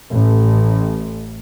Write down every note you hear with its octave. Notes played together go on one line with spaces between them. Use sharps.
A1